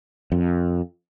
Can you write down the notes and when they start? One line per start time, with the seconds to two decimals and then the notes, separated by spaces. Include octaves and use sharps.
0.32 F2